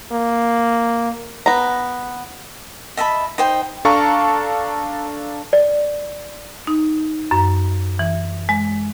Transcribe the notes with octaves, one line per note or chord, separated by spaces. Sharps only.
A#3
B3 A#5
D#5 E5 A5 B5
D#4 C5 G5
D4 A4 F5 A5 A#5 C#6
D5
D#4
F#2
E3
G#3